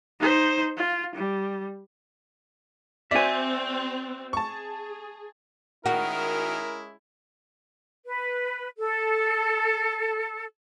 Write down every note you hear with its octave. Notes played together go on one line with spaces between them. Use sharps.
D#4 C5
F4
G3
C4 F#4 D5 E5 G#5
G#4 A5 C#6
D#3 G#3 C#4 E4 F#4 A#4
B4
A4